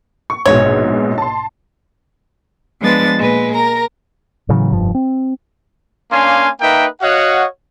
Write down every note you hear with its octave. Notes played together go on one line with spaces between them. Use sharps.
C#6
A#1 G#2 B2 C#5
A5 C6
F3 G#3 B3 D4 B4 A6
A#2 G#3 B4
A#4 A#5
A2 C#3 E3 F#3
F1 G2 F3
C4
A#3 C#4 D4 F5 G#5 C6
A#3 D#4 A#4 B4 E5 G5
F#4 C#5 D#5 F5 F#5